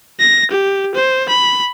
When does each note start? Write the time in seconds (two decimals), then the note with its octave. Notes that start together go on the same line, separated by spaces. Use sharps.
0.20 A#6
0.51 G4
0.95 C5
1.29 B5